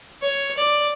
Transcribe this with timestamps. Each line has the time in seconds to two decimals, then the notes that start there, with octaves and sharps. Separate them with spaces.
0.22 C#5
0.58 D5